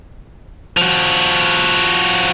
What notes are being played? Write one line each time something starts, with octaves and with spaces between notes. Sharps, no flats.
F3 F#4